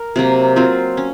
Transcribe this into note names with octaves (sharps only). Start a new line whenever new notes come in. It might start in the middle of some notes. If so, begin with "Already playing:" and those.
Already playing: A#4
C3 F#3 A#3
F#3 C4 F4
C#4